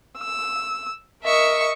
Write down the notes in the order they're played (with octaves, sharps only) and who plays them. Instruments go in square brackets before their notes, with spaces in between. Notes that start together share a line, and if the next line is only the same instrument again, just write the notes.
[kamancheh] E6
[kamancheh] A#4 D#5 [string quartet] E5 C#6